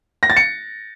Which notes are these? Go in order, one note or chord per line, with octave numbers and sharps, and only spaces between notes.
A#6
A6
C#7